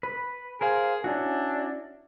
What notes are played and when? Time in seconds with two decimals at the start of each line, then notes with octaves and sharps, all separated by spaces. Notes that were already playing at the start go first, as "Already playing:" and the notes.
0.03 B4
0.61 G#4 A#4 C5 F5
1.04 C#4 D4 E4 F#4